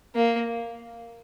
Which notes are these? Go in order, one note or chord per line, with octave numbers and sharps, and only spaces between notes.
A#3